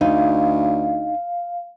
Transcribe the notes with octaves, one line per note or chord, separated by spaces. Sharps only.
D2 D#4 F5